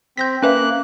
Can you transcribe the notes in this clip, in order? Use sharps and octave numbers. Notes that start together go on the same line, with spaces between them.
C4 G6 A#6 B6
A#3 C#4 B4 E5 F#6